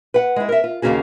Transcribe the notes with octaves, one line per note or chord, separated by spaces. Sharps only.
B4 F#5
G#3 E4
A#4 E5
F4
D#2 C#3 A#3 C#4 F#4 G#4